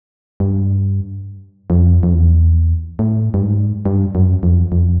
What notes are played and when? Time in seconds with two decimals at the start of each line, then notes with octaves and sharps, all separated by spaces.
0.40 G2
1.70 F2
2.03 F2
2.13 E2
2.99 A2
3.34 G2
3.42 G#2
3.86 G2
4.15 F#2
4.43 F2
4.72 F2